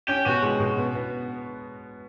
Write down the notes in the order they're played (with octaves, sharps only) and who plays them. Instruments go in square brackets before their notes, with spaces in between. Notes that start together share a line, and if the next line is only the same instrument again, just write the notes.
[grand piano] C#4 [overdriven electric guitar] G4
[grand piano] B2 [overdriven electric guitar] F#4
[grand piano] G#3
B2
B3
B3